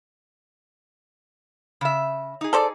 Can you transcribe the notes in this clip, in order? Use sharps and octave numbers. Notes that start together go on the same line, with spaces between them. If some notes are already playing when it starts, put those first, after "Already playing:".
C#3 E5
D#4 G#4
A4 C5 D5